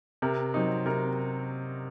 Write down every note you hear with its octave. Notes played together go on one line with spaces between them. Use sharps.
C3 A#4
F#3 C4 D#4
C3 A#4